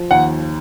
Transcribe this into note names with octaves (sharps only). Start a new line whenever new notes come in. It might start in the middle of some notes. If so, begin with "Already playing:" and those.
Already playing: F3
D#2 F#5